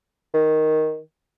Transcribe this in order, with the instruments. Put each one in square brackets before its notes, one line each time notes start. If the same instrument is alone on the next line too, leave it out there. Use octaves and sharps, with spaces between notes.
[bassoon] D#3